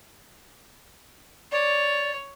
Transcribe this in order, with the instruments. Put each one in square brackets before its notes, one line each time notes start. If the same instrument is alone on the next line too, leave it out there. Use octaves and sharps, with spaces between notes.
[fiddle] C#5 [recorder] D5